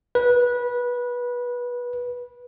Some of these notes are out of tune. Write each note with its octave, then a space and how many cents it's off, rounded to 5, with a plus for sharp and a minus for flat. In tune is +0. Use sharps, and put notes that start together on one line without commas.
B4 -20